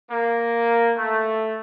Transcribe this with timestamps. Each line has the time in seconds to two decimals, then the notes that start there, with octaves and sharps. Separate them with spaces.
0.11 A#3
0.96 A3